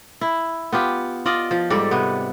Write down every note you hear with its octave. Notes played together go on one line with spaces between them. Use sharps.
E4
B3 F4 G4
F4 D5 D#5
F3
G#2 G3 A4 D5
C3 B3